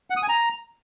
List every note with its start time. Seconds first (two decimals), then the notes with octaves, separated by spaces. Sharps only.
0.10 F#5
0.16 D#6
0.23 G#5
0.29 A#5